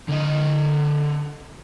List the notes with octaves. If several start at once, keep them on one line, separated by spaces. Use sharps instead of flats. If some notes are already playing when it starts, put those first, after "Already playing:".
D3 D#5